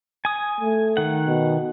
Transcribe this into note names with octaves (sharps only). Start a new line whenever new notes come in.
G#5 D#6
A3
D#3 F#5
B2